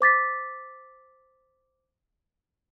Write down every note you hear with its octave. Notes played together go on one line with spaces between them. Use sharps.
C5 D6 A6 B6